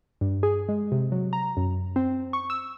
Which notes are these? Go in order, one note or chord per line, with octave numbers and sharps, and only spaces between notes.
G2
G#4
G#3
C3
F#3
A#5
F#2
C4
C#6
E6